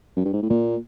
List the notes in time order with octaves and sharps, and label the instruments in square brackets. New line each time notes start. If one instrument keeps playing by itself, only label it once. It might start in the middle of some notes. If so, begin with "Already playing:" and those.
[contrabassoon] F#2
G2
G#2
A2
[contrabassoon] A#2 [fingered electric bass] A#3